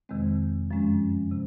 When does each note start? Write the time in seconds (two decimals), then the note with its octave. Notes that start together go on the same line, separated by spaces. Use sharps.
0.09 F2 C3 D#3 G#3 C4
0.71 F#2 F3 G#3 C#4
1.32 C3